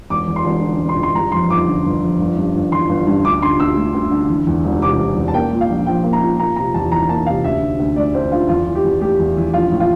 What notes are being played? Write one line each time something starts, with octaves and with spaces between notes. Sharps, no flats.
E1 D6
E2
C6
E1
D3
E1
C6
E2
C6
G1 A#5
F2 C6
G1 D6
D3
G1
F2
G1
G2
G1
E3 C6
G1
G2
D2 D6
D3 C6
D2 E6
A3
D2
D3
E3
E2
E1
C3 D6
E3
E2
A5
A#3 G5
A#2
F5
A#1
F3 G5
A#3
A#5
A#2
A#3 A#5
C3 A#5
E2 A5
E3 A#5
A#3 A5
C3 F5
D2 E5
D3
D2
A3 D5
D2 C5
D3 F4
E2 F4
E3
G4
E2
A3 G4
E2
E3
A#1 F4
A2
F4